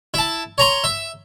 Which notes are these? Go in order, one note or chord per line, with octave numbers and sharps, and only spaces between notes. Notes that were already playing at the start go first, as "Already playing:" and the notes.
E4 A5
C#5 A#5 C6
E5